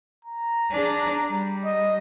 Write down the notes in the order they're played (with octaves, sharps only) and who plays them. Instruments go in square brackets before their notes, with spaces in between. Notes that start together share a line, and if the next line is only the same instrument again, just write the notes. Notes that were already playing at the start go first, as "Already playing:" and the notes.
[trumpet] A#5
[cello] D4 G#4
G3
[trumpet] D#5